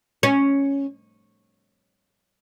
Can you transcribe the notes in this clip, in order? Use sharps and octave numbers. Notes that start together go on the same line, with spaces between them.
C#4